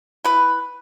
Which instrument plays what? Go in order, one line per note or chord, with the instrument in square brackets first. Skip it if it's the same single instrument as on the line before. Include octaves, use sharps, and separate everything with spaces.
[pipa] E4 B4